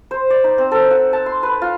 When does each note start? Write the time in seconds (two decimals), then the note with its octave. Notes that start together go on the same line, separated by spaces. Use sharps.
0.11 C5
0.30 D5
0.44 D#4
0.58 C4
0.71 A4
0.91 F#5
1.13 A5
1.26 C6
1.43 B4
1.62 F4